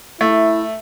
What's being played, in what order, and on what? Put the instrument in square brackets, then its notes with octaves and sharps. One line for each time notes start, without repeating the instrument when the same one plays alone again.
[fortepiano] A3 [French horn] E4